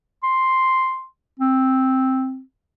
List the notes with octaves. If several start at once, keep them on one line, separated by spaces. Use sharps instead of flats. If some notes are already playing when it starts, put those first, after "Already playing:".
C6
C4